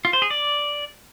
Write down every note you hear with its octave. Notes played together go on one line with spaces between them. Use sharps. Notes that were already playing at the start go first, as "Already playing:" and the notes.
F4
C5
G#4
D5